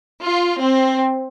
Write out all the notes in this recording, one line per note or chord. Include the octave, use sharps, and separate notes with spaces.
F4
C4